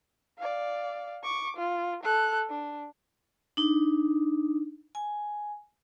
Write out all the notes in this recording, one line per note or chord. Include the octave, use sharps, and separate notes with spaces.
D5 F5
C#6 D6
F4
A4 F#6
D4
D4 D#4
G#5